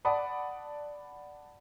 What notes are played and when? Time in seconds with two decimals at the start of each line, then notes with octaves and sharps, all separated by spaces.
0.05 D5 F#5 A5 B5 D#6